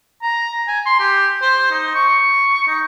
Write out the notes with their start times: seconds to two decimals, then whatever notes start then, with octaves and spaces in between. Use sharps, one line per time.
0.23 A#5
0.68 G#5
0.86 C6
0.99 G4
1.42 C5
1.71 D#4
1.95 C#6
2.68 D#4